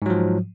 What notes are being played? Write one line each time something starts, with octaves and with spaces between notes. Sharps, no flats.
G#2 F3 F#3